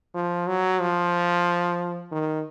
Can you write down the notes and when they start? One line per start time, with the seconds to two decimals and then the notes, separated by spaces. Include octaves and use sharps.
0.14 F3
0.47 F#3
0.80 F3
2.12 D#3